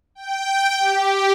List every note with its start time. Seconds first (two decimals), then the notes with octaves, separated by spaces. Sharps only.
0.15 G5
0.79 G4